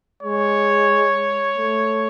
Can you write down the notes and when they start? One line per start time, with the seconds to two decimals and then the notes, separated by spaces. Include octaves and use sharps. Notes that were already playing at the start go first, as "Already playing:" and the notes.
0.23 G#3 C#5
1.58 A3